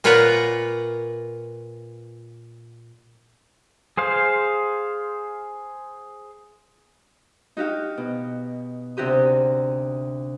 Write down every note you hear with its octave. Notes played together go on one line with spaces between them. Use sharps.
A#2 F4 B4 C#5 F#5 A#5
G#4 C5 F5
D#4 F#4 G4 F5
B2
D2 C3 F#4 G4 D#6